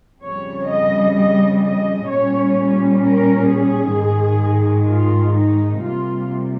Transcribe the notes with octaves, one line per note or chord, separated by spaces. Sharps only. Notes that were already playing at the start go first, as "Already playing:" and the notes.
F2 C#3 G3 C#5
D#5
D#5
D#5
A#2 G3 C#4 C#5
A#4
G#4
G#2 D#3 G#3
F4
D#4
C3 G3 A#3 F4